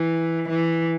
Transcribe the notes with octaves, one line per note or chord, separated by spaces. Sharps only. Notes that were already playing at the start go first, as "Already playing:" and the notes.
Already playing: E3
E3